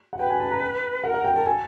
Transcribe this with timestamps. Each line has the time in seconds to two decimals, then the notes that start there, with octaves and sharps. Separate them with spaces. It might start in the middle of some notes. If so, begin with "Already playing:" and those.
0.13 F#5
0.19 B4 G5
0.30 G#5
0.40 A5
0.51 A#5
1.04 A#4 F#5
1.14 F#5
1.24 G5
1.34 A#4 A5
1.46 A4 G#5